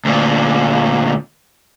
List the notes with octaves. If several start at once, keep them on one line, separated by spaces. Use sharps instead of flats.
D2 A#2